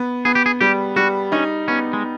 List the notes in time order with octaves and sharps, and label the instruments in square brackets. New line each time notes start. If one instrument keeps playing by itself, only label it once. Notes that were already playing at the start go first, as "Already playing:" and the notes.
Already playing: [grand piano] B3
[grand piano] B3 [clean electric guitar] G#4
[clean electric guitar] G4
G#4
[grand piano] G3 [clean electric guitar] G4
[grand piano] G3 [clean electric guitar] F#4
[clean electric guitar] C#4 [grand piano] D#4
[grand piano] B3 [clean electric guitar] C#4
[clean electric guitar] G#3